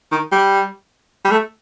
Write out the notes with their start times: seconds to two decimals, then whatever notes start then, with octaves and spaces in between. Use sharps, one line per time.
0.12 D#3
0.32 G3
1.25 G3
1.31 A3